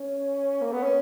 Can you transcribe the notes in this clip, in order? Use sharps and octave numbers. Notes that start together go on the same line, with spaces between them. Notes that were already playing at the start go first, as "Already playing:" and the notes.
Already playing: C#4
A#3
B3
C#4